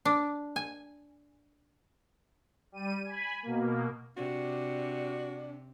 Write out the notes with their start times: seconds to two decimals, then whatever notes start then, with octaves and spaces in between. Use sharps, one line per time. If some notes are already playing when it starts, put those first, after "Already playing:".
0.05 D4
0.56 G#5
2.72 G3 D#7
3.04 G#5 B5
3.43 B2 A#3
4.17 C3 D4 F#4